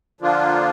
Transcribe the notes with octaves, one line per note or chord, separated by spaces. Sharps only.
D3 F3 A#3 D4 F4